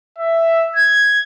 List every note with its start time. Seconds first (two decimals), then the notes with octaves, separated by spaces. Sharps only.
0.18 E5
0.76 G#6